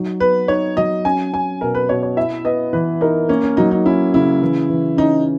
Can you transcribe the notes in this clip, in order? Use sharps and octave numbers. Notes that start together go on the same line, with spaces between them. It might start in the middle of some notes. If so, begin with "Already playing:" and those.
Already playing: F#3 D#4
B3 B4
D#4 C#5
F#3 D#5
C#4 G#5
C#4 G#5
B2 A#4
B4
B2 C#5
C#5
E4 E5
B3 D#5
E3 B4
D#4 A#4
A#3 C#4
C#4
F#3 D#4
D#4
C#4 E4
C#3 E4
E3
E3
C#4 D#4